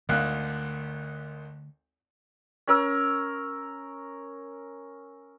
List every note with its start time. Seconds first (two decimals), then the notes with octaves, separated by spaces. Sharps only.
0.09 G#1 D2 D3 A3 A#4 F5 F#6
2.68 C#4 A#4 E6